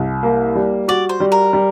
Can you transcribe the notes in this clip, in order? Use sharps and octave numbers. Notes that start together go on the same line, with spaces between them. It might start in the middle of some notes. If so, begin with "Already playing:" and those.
Already playing: C2
A#3
G3
F#4 D5
C5
G3
A#4
G3